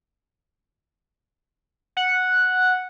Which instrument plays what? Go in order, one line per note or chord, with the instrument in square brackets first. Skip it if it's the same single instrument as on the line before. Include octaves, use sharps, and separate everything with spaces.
[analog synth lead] F#5